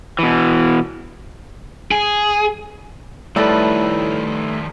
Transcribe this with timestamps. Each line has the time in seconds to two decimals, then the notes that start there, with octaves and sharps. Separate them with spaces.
0.19 B2 E3
1.91 G#4
3.36 A2 D#3 F3 G3 A3 A4 B4